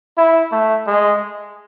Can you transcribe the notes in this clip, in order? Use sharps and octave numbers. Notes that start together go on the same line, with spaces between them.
E4
A3
G#3